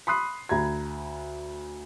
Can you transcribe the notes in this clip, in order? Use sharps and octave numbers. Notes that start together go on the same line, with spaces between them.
B5 C6 D#6 F#6 C7
D2 A#5 B5 G#6